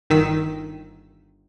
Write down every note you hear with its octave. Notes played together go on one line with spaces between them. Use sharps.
G1 D#3 E6 B6